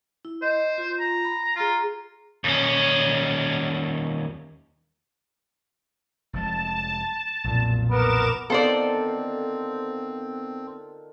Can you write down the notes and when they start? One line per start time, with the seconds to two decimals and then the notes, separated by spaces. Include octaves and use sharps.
0.25 E4
0.42 C5 D#5
0.78 F4
0.99 A#5
1.25 B5
1.56 F4 G#4 A#5
2.44 D#2 C#4
6.33 F1 F3 G#3 A5
7.44 B1 F2 A#2
7.90 B3 A#4 D6 E7
8.50 D3 D#3 B3 C4 F4 A4 C5 D5